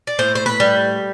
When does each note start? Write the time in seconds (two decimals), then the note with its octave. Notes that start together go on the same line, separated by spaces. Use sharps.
0.07 D5
0.19 A2 C5
0.35 C5
0.46 B4
0.60 G3